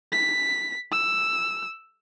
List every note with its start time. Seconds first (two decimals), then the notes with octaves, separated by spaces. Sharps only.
0.12 B6
0.92 E6